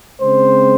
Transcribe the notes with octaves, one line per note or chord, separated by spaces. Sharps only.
C#3 G#3 C4 C5